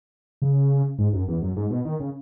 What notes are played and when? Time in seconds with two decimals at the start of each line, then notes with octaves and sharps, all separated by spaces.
0.42 C#3
0.98 G#2
1.13 F#2
1.28 E2
1.42 F#2
1.56 G#2
1.70 B2
1.85 D#3
2.00 C#3